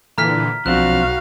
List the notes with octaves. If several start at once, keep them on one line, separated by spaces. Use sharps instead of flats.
A#2 D3 E3 A#5 F6 B6
B1 F3 C4 D4 F#4 F5 F#6